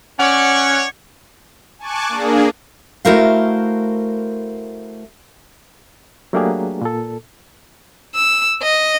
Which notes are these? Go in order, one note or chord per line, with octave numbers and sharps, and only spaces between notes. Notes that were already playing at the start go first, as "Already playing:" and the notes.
C#4 C#5 D5 F#5
G#5 A5 C#6 D6 F#6
A#3 D4 G#4
A3 E4 F#4 A#4 C5 F5
F#3 A3 A#3 D4 G4 G#4
A#2 A4
E6
D#5